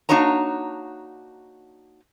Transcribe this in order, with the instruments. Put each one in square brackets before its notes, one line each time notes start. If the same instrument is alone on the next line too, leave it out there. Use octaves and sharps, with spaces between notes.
[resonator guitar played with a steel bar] A#3 D4 D#4 F#4 C#5 A#5